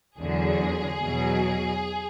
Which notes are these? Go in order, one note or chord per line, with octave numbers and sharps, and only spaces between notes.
E2 D3 F#3 G#4
E2 B2 F#3